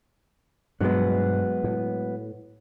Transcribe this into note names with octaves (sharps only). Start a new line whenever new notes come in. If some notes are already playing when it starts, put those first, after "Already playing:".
G2 B2 F3 F#3 G#3 B3
A2